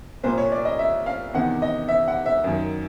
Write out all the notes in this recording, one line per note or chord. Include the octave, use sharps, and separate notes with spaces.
C2 A#2 F3 C5
C#5
D5
D#5
E5
F5
E2 C3 D#3 F#5
D#5
E5
F#5
E5
F#2 D#3